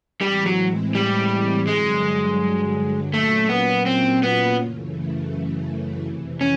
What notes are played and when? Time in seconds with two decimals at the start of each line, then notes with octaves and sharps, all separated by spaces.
0.21 A2 E3 G3 G#3 C4 E4
0.46 F#3
0.95 G3
1.67 G2 D3 F#3 G#3
3.13 A#2 F#3 A3 A#3 C#4 F4
3.49 B3
3.86 C4
4.23 B3
4.59 F#2 C#3 E3 A3
6.04 F2 C3 E3
6.41 C#4